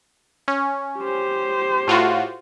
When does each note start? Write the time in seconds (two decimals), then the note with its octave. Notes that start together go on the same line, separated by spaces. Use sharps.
0.48 C#4
0.99 G4 C5
1.87 A2 F4 F#4